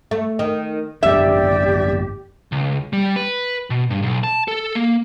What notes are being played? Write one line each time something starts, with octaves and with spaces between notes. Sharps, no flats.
A3
D#3
G#1 F#2 D4 G4 D5 E5
C#2
G3
B4
B2
G2
B1
A5
A4
A#3